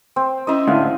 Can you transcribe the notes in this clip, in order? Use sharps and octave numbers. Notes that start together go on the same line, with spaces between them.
C4
C#4 E4 D#5 E5
D2 A2 F5